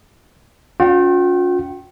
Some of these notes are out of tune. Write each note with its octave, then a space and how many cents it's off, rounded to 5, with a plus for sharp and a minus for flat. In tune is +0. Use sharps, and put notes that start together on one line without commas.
C#4 +45 F4 +45 G5 -25